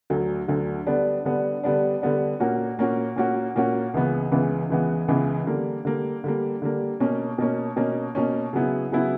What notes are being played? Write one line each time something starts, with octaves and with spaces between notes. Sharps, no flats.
D2 D3 F#3
D2 D3 F#3
D3 G3 B3 D4
D3 G3 B3 D4
D3 G3 B3 D4
D3 G3 B3 D4
A#2 A#3 C#4 F#4
A#2 A#3 C#4 F#4
A#2 A#3 C#4 F#4
A#2 A#3 C#4 F#4
C#2 C#3 E3 B3
C#2 C#3 E3 B3
C#2 C#3 E3 B3
C#2 C#3 E3 B3
D3 G3 A#3
D3 G3 A#3
D3 G3 A#3
D3 G3 A#3
B2 A#3 C#4
B2 A#3 C#4
B2 A#3 C#4
B2 A#3 C#4
C#3 F#3 B3 E4
C#3 F#3 B3 E4